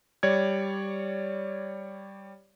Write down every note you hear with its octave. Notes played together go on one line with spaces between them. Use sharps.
G3 C#5 D5 G#6